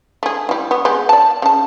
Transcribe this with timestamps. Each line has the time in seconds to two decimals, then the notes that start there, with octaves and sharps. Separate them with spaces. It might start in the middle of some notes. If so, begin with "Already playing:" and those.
0.23 A3 G#4
0.49 E3 G3
0.71 B3 F#4
0.85 G#3 B3 G4
1.09 D5 A5
1.42 C#3 A5